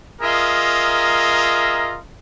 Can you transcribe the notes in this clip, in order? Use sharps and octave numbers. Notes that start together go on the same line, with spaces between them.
F4 G#4 A#4 D#5 E5 A#5